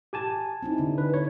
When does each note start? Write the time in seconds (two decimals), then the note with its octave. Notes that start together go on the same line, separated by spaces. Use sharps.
0.13 G4 G#5 A5
0.62 C4 D#4 E4
0.78 D3 D4
0.98 B4
1.14 C#5